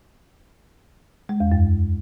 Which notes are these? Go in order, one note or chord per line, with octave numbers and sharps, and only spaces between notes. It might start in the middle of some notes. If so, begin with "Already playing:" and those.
G#3
E2
F#2